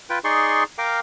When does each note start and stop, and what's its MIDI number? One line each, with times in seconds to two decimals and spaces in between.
0.10 0.19 65
0.10 0.19 71
0.10 0.19 79
0.24 0.64 63
0.24 0.64 68
0.24 0.64 74
0.24 0.64 84
0.24 0.64 85
0.78 1.00 70
0.78 1.00 77
0.78 1.00 79
0.78 1.00 86